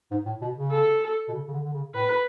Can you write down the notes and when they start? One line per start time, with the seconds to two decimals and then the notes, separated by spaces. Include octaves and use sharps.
0.11 G#2
0.25 A2
0.41 B2
0.56 C#3
0.71 A4
1.28 B2
1.33 C#3
1.48 C#3
1.53 D3
1.64 D3
1.74 C#3
1.94 A2 B4